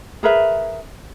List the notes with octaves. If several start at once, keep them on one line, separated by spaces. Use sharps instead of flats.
G#4 A#4 B4 E5